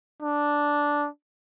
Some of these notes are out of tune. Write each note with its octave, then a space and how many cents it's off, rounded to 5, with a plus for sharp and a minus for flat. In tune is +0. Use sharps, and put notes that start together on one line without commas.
D4 -5